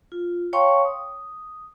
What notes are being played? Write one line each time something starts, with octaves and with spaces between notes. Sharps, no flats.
F4
C#5 F5 G5 A5 C6 C#6
D#6